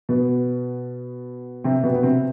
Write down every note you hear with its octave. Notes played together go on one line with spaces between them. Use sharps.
B2 B3
C3 C4
B2 B3
B3
C3 C4